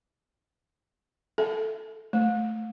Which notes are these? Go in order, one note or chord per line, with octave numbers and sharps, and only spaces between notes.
A4
A3